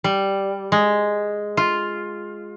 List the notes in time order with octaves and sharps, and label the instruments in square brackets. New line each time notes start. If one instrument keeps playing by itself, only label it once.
[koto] G3
G#3
F4